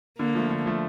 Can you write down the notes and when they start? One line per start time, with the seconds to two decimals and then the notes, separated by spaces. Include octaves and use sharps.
0.19 D3 A#3
0.35 F3 A3
0.50 D3
0.66 F3 A3